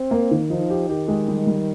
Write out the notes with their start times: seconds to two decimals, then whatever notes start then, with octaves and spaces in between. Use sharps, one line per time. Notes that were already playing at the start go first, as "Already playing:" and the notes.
Already playing: C4
0.11 A#3
0.31 D#3
0.50 F3 D#4
0.70 G4
0.89 D#3 G4
1.08 G#3
1.28 G3
1.47 G3